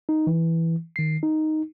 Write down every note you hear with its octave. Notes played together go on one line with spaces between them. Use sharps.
D#4
E3
D#3 C7
D#4